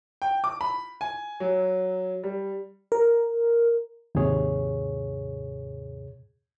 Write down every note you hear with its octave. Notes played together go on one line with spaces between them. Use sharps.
G5
D6
B5
G#5
F#3
G3
A#4
D#2 G#2 C3 G#4 C#5